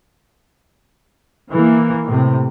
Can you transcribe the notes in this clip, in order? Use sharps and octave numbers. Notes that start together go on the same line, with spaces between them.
E3 A#3
A2 C3